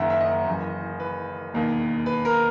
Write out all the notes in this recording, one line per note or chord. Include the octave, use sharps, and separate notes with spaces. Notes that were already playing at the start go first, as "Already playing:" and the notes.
Already playing: F#1 F#2 D#3 E5 F#5 A#5
E5
D#5
F#1 F#2 E3
B4
E1 D#2 D#3
B4
A#4